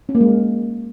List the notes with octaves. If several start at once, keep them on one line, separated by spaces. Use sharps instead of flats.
C#4
A#3
G#3